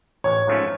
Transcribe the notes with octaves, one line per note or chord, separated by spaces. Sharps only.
A1 C#5
G#2 F3 A3 C#4